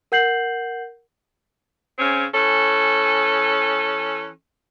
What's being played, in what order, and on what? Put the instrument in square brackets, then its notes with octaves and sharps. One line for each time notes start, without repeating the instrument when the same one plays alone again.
[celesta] A#4 F#5 G6 C7 F#7
[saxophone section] C#3 C4 C#4
E3 C#4 A4